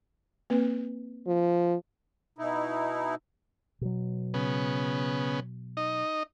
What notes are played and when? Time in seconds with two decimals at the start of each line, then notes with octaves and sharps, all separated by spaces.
0.50 A#3 C4 B4
1.27 F3
2.38 B2 D#4 E4
3.81 B2 F#3
4.34 C#3 B3
5.77 D#4 D#5